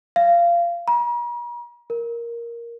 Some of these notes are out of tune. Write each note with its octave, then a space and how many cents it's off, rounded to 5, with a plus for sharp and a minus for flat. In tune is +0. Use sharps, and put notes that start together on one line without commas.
F5 -20
A#5 +45
A#4 +5